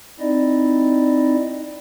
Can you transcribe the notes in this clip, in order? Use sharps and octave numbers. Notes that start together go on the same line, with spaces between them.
C4 D#4 E4 D5 D#5